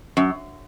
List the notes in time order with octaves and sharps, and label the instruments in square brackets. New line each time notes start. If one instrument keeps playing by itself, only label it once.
[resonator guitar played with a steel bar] F#2